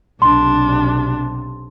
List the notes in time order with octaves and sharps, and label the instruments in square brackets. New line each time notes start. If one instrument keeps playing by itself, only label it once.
[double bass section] B1 C3 [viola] D4 [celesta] C6